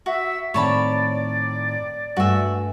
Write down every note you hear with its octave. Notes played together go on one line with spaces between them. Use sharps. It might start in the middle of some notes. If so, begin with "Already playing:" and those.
F#4 E5
A2 D#3 C4 C#5 D5 A5 B5
G2 A3 F#4 E5 G#5